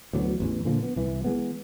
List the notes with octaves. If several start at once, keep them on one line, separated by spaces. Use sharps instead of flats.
D2 E3 F#3 B3
A1 E2 E3
A#2 D3 F3 A#3
B3
C2 E3
E3 G#3 B3